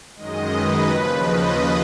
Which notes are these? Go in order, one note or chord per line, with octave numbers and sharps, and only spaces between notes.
F#2 D#3 G#3 D#5
B4
D#2 C#3 F3
D#5